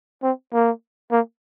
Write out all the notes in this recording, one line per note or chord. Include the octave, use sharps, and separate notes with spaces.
C4
A#3
A#3